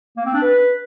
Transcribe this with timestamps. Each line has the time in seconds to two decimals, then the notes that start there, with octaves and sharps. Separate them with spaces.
0.17 A#3
0.25 C4
0.34 D4
0.42 B4